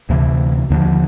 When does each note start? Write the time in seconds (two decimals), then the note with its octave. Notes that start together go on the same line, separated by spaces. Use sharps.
0.09 D2 C3 E3
0.70 D#2 D3 F3